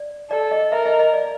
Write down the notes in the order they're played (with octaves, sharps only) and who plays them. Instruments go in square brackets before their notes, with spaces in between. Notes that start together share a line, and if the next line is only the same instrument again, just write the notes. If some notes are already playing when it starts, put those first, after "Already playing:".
Already playing: [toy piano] D5
[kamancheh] A4 [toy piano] D5
[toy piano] D#5
[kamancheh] A#4 [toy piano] E5
[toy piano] D#5
D#5
D5